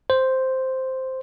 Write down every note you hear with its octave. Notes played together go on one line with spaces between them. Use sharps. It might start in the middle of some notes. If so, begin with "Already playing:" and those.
C5